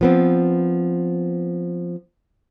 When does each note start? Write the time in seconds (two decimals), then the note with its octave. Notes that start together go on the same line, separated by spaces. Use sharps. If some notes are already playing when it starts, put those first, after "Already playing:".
0.01 F3 B3 C4